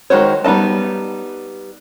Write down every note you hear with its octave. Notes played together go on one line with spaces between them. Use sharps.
D#3 G#3 F#4 C5 C#5
G3 B3 D#4 D#5 A5